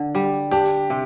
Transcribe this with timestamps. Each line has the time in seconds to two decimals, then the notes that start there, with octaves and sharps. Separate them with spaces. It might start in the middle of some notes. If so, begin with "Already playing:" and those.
Already playing: D3
0.15 G3
0.51 D4 G4
0.90 C3